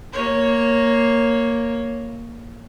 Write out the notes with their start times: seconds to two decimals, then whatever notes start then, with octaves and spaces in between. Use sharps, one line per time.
0.13 A#3 C#5